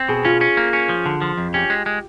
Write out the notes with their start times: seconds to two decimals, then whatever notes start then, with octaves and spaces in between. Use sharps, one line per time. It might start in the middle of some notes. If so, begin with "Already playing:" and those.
Already playing: C4
0.09 B2 G#4
0.25 C#4 F4
0.41 C#4
0.57 A#3
0.73 C#4
0.89 F3
1.06 D3
1.22 F3
1.38 F2
1.54 C#4 G4
1.70 G#3
1.86 G#3